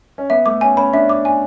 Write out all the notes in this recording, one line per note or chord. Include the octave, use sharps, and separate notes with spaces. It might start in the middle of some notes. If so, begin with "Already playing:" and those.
C#4
B3 E5
A3 D6
C#4 G#5
C#4 B5
D4 E5
D6
G#5